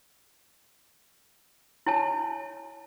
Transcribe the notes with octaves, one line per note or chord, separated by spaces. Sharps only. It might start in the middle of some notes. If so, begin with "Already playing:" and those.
E4 C#5 G#5 A5